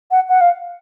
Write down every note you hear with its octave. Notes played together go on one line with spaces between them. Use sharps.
F#5
F#5
F5